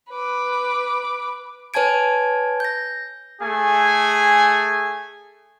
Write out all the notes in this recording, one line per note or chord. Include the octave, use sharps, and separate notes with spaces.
B4 D6
B4 C#5 G#5 A5 G#6 D7
G6 A#6
A3 G#4 G#5